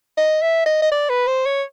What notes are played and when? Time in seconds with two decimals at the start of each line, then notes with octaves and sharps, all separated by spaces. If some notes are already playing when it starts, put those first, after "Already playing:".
0.17 D#5
0.42 E5
0.66 D#5
0.82 D#5
0.91 D5
1.09 B4
1.27 C5
1.46 C#5